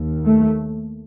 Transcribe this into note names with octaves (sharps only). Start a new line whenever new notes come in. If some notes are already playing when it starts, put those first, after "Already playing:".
Already playing: D#2
A3